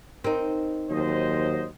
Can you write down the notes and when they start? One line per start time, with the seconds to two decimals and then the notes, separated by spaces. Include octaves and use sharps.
0.24 C4 D#4 A#4
0.90 D#2 F#3 C5 D#5